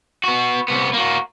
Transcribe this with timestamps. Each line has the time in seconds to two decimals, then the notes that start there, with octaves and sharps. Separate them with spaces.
0.24 B3 F#4
0.68 C2 B3
0.93 A#3 F#4